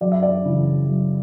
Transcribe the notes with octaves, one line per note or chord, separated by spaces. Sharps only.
F#2 D5
E5
D5
C#3 E3
F#2